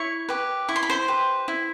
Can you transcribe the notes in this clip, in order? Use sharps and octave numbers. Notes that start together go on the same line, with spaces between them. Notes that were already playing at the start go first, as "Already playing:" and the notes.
Already playing: E4 C#5 C#6
G4 B4
E4 C#6
C6
B5
C5 C6
G4 B4
E4